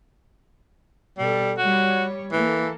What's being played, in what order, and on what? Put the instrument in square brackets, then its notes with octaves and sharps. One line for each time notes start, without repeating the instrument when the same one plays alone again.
[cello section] B2 A4 [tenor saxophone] G3
[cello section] G3 C#5 [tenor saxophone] F#4
[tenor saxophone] E3 [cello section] A#3 A4